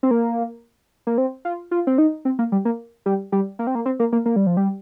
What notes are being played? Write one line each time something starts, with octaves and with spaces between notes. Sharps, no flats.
C4
A#3
A#3
C4
F4
F4
C4
D#4
C4
A#3
G3
A#3
G3
G3
A#3
C4
A#3
C4
A#3
A#3
A#3
G3
F3
G3